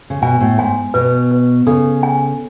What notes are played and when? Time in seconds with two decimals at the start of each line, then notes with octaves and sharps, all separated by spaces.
0.10 C#3
0.22 B2 G#5
0.40 A2
0.58 G#2 G#5
0.94 B2 B4
1.31 B4
1.67 C#3 A4
2.03 G#5